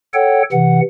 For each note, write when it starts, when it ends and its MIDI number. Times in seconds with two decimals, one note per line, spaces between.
0.14 0.43 69
0.14 0.43 73
0.14 0.43 78
0.14 0.43 79
0.52 0.81 48
0.52 0.81 52
0.52 0.81 78